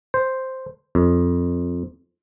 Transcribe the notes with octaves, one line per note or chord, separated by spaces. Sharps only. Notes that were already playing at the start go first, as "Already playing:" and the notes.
C5
F2